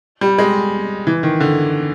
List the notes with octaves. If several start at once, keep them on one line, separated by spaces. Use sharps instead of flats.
G3
G#3
E3
D#3
D3